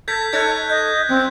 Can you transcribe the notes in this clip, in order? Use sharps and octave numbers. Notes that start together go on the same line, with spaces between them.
A4 G6 G#6 B6
D#4 A4 C#5 F#6 G#6
D#5 G6
F2 C4